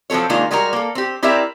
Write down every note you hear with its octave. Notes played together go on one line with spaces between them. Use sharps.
F3 F#3 C4 A4 C#5
D#3 G#3 A#3 D4 F4
G3 G#3 F#4 G#4 A#4
A#3 A4
C4 G4
C4 E4 G4 A#4 D5 E5